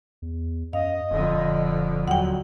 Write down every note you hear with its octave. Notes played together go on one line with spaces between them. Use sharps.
E2
F#2 D#5 F5
D#1 F2 D3
D#2 F#3 F#5 G5